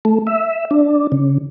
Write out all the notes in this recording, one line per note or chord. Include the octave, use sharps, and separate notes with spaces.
A3
E5
D4
C#3